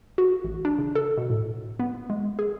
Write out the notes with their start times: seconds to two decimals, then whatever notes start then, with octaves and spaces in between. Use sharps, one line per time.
0.18 F#4
0.44 A1
0.65 D4
0.78 C#3
0.95 A4
1.17 B2
1.30 A2
1.79 B3
2.10 G#3
2.39 G#4